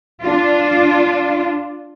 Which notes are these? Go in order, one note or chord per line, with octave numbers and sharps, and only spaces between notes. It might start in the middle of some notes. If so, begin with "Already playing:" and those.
D4 F4